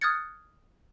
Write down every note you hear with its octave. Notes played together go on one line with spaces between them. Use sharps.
D#6 F6 F#6 G#6 A6 C#7